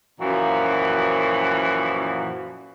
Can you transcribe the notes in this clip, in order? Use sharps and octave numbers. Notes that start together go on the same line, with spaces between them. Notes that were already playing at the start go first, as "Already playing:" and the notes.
F#2 A#2 E3 F3 F#4